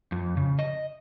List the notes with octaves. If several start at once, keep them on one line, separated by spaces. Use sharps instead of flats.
F2
C#3
D#5